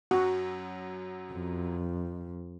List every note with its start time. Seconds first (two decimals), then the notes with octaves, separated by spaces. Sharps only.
0.11 F#2 F#3 F#4
1.32 F2